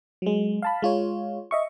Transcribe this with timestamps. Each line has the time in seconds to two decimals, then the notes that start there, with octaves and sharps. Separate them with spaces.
0.22 F#3 G#3
0.62 F5 A5 B5
0.82 G#3 F4 C#5
1.51 D#5 E5 C#6